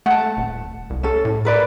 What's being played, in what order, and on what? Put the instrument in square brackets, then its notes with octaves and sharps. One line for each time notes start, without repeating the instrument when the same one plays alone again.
[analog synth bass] A3 [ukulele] F#5 A5
[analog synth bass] D#1
C2
[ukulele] C#4 A4
[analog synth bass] A2
[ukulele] A#4 B4 D5